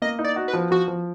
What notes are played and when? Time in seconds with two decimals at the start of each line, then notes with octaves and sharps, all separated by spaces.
0.02 A#3 D#5
0.19 D#4
0.24 D5
0.36 F#4
0.48 B4
0.53 F3
0.71 F3 F#4
0.88 F3